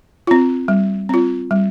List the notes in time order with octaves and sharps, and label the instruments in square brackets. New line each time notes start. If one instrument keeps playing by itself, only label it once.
[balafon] C4 F4
G3
C4 F4
G3